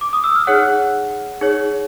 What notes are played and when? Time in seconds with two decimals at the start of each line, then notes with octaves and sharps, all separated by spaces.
0.01 D6
0.13 D#6
0.24 E6
0.36 F6
0.47 D#4 G#4 C#5 F#5 F#6
1.41 D#4 G#4 C#5